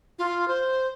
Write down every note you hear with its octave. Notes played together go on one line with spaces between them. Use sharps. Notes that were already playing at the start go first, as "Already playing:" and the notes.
F4
C5